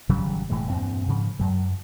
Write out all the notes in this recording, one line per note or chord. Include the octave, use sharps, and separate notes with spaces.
G#1 C#3 F#3 G3
E1 A2 E3 G#3
E2 G2 A#2 C4
G#2 C#3 F3
F#2 F#3